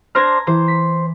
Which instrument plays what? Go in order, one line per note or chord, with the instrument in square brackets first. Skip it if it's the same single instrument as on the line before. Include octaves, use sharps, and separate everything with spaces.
[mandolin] D4 C5 F6 [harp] A#5 G#6 A#6
[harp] E3 [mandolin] C5
[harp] B6